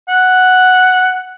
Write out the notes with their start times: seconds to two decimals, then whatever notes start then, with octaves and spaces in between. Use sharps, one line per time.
0.09 F#5